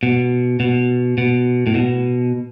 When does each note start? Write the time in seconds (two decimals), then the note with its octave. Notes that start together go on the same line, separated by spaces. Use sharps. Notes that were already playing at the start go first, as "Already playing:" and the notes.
0.03 B2
0.60 B2
1.18 B2
1.67 A2
1.75 B2